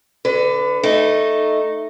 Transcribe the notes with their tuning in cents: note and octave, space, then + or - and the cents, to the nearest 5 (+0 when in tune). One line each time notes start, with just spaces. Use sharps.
D3 +0 B4 +30
A3 +0 D#4 -10